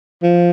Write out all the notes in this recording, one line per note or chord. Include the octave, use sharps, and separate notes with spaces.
F3